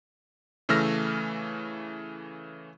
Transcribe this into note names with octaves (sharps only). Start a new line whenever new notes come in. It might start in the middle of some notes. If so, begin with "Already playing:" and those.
C#3 E3 A3 E6 F6 A#6